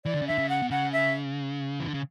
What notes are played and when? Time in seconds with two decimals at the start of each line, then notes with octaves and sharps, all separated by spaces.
0.05 E3 D5
0.14 D3
0.22 C#3
0.27 D3 E5
0.38 C#3
0.49 F#5
0.62 B2
0.71 C#3 F#5
0.92 E5
1.80 E3
1.88 D3
1.94 C#3